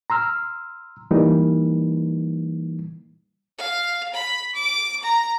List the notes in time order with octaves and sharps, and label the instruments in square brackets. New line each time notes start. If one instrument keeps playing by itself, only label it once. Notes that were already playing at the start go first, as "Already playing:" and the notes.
[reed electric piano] A#5 C6 E6 F6
E3 G3 A#3 D#4
[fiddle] F5
B5
D6
A#5